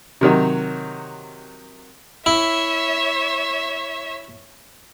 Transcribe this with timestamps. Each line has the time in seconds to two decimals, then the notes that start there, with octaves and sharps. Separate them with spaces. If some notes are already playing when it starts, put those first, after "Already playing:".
0.21 C3 D#3 F#3
2.26 E4 C#5 E5